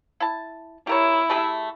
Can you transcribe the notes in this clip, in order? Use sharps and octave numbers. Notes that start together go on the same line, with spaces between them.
E4 A5
E4 G4 A#4 C#5
A3 G4 G#4